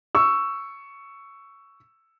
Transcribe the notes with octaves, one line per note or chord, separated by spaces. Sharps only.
C#6 E6